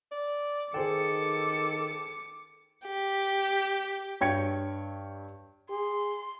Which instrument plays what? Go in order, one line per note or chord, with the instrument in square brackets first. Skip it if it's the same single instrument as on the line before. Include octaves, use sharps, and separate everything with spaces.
[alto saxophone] D5
[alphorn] D#3 [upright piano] G#4 C5 G5 [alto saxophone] A4 [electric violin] D6 C#7
[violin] G4
[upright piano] G2 C#5 G5 G#6 C#7
[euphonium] G#4 [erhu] C6